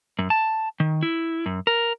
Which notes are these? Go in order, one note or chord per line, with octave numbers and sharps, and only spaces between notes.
F#2
A5
D#3
E4
F#2
A#4